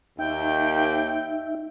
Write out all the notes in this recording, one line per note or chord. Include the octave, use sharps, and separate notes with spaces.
D#2 D#4 E5 G5